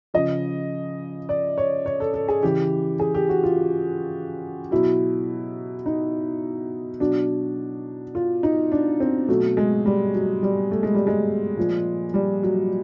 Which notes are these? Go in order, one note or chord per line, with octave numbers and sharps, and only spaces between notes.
C#3 F3 D#5
D5
C#5
C#5
A4
A4
G#4
C#3 E3 G4
G#4
G4
F#4
F4
B2 F#3 E4
D#4
B2 F#3 D4
F4
D#4
D4
C4
B2 F#3 A3
G#3
G3
F#3
G3
A3
G#3
G3
G#3
A#2 F3
G3
F#3